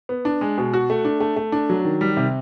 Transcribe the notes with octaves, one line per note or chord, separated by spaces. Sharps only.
B3
D4
G#3
B2
F#4
A3
D4
A3
A3
D4
F#3
D#3
G3
C3